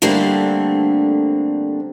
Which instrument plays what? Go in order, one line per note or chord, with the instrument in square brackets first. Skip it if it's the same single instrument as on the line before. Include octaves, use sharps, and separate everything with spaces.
[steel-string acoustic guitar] D3 G3 A3 A#3 C4 D4